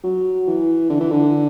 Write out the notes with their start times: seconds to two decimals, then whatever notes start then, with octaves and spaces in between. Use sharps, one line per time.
0.04 F#3
0.47 E3
0.89 D3
1.00 E3
1.10 D3